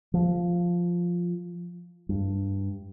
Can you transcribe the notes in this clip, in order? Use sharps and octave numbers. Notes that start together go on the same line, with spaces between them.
F3
G2